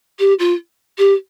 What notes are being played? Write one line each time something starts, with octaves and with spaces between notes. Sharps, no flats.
G4
F4
G4